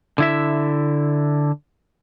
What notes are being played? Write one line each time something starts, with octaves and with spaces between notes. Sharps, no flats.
D3 E4 E5